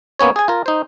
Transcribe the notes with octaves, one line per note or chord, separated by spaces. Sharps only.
A#3 B3 C#4 C#5
G#4 G#5
F4 A#4
D#4 C5